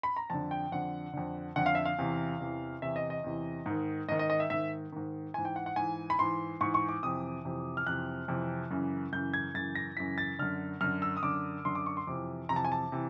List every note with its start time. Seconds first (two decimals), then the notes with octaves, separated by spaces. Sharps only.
0.03 B5
0.16 A#5
0.30 F2 D3 A5
0.51 G5
0.72 F2 D3 F#5
1.13 F2 D3
1.56 F2 D3 F#5
1.66 F5
1.75 E5
1.85 F5
1.98 E2 C3 E3
2.40 E2 C3 E3
2.82 E2 C3 E3 E5
2.96 D#5
3.10 D#5
3.24 E2 C3 E3
3.66 G#2 D#3
4.09 G#2 D#3 D#5
4.19 D#5
4.30 D#5
4.40 E5
4.50 G#2 D#3 E5
4.92 G#2 D#3
5.34 G#2 E3 G#5
5.45 G5
5.56 F#5
5.66 F#5
5.76 G#2 E3 G#5
6.10 B5
6.19 G#2 E3 C6
6.61 G#2 E3 C#6
6.74 C#6
6.89 D6
7.03 F2 C3 E3 D#6
7.45 F2 C3 E3
7.77 F6
7.87 F2 C3 E3 F#6
8.28 F2 C3 E3
8.71 F#2 C#3 E3
9.13 F#2 C#3 E3 G6
9.34 G#6
9.55 F#2 C#3 E3 A6
9.75 A#6
9.97 F#2 C#3 E3 B6
10.18 A6
10.39 F#2 D3 F6
10.81 F#2 D3 F6
11.02 E6
11.17 D#6
11.23 F#2 D3 D6
11.65 F#2 D3 C6
11.75 D6
11.86 C#6
11.97 C6
12.07 F2 C3 E3 D6
12.49 F2 C3 E3 A#5
12.56 A5
12.65 G#5
12.72 A5
12.92 C3 E3